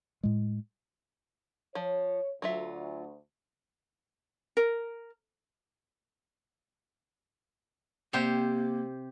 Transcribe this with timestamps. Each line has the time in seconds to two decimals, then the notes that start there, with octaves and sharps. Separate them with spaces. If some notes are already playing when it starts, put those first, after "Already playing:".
0.23 A2 G#3
1.75 F3 C#5
2.42 D2 F#3 F4 E5
4.57 A#4
8.13 C3 A#3 G4 C5